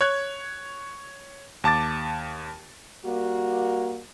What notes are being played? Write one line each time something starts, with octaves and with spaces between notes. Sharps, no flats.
C#5 F#6 G#6
D#2 A5 D6 A6
G3 A#3 F#4